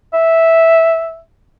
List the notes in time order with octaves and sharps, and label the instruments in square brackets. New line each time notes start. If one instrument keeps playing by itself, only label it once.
[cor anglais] E5